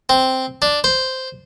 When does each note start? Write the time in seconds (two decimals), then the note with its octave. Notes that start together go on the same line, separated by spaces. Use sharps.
0.09 C4
0.62 D4
0.84 C5